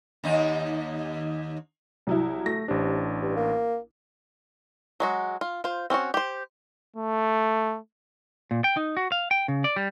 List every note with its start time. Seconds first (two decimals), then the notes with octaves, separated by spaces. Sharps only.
0.24 D#2 D#4
2.07 C2 F#3 E4
2.46 A3 A#6
2.68 A1 C3 D4
3.22 G2
3.36 A#3
5.00 F#3 G#3 F#4
5.41 F4
5.64 F4 C5
5.90 C4 C#4 F4 F#4
6.14 G4 C5
6.97 A3
8.51 A#2
8.64 G5
8.77 D#4
8.97 F#4
9.12 F5
9.31 G5
9.48 C#3
9.64 D5
9.76 G3